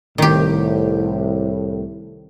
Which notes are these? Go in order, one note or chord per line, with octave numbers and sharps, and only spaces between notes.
C2 A2 D#3 G4